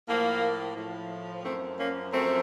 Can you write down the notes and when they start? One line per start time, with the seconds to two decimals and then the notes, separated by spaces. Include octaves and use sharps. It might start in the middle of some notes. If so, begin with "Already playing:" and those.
0.08 A2 F3 A#3
0.76 A2 F3
1.44 F#2 F3 A3 C4
1.78 A#3 C#4
2.12 F#2 F3 A3 C4